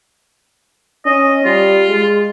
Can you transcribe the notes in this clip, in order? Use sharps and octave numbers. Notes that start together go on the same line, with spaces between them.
C#4 D#5
G3 F4
G#3